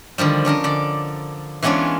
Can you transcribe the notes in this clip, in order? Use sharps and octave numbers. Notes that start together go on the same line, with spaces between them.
D3 D#3 F3 G3
C#4 D4 A#4 D#5
D3 D5
E3 G#3 B3 C#4 D4 F4